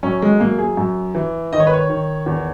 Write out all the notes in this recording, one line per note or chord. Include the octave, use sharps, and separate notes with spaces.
F#2 C#4
G#3
F#2 A#3
G#4
F#2
E3
D#3 D#5
C#5
B4
C#5
D#3
E2